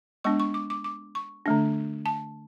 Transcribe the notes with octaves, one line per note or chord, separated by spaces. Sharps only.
G#3 B3 D4 C#6
C#6
D6
D6
D6
C#6
D3 A3 D4
A5